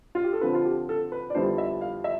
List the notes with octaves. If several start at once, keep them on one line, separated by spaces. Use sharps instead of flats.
F4
G4
A4
D3 F3 C4 F4 B4
F4
G4
A4
B4
D5
F2 D3 G3 B3 E4 C5
E5
F5
E5